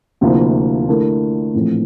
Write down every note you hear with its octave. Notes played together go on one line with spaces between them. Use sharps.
D2 C3 F3 A#3 E4
D3 A3 E4 A#4
A#1 A2 E3 A3 C4